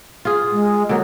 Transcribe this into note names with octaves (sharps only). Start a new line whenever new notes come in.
F4 G#4
G#3
D3 F#3 A#3